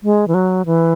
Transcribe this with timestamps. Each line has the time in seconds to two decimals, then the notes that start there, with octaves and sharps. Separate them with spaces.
0.03 G#3
0.28 E3
0.34 F#3
0.66 E3